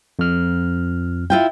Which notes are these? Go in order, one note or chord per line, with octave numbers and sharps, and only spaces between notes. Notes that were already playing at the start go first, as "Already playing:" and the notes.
F2 F6
E4 F4 G5